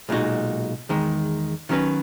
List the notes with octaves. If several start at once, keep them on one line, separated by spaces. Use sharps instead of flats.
B1 A#2 G#3 D#4 F#4
E2 D#3 G#3
D#3 F#3 C#4 F#4 B4